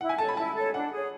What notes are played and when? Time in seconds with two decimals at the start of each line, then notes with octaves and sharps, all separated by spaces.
0.01 E4 F#5
0.09 G#5
0.18 A4 C#5 A5
0.29 B5
0.37 E4 A5
0.56 A4 C#5
0.74 D4 F#5
0.92 G#4 C#5